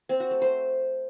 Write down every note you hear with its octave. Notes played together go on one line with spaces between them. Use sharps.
C4
F#4
A3
C5